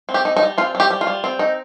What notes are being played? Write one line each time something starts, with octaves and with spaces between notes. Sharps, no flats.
C4
G4
D#4
D#4
G3
C4 F4
G3
G4
G3
F4
G3
C4
D#4